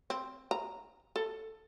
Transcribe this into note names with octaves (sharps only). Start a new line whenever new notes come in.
C4
A#5
A4